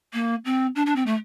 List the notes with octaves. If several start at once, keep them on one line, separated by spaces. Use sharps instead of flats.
A#3
C4
D4
D4
C4
A3